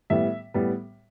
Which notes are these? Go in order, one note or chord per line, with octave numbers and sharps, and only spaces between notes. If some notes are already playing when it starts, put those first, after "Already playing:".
A2 G3 B3 E5
A2 G3 B3